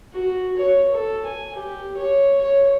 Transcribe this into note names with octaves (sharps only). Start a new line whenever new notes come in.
F#4
C#5
A4
G#5
G4
C#5
C#5